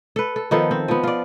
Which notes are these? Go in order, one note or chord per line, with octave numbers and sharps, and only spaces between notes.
A4 B4
A4
D#3 F3 B3 A4
C4
F3 B3
F4 D5